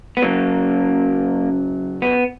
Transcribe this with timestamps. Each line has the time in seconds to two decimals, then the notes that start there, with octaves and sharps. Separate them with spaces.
0.17 B3
0.22 F#2 C#3 F#3 A#3
2.02 B3